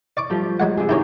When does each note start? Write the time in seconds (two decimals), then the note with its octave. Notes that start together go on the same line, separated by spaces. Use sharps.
0.17 D5 C#6 D6
0.30 F3 G3 A3
0.60 F#3 G#3 F#5
0.77 C3 G#4
0.89 D#3 A#3 D#4 E4 G4 C#5